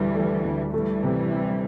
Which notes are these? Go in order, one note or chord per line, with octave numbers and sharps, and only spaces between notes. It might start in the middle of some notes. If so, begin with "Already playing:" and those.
Already playing: D2 D3 E3 G3
A3
D2
E3 G3 A3
C3
C4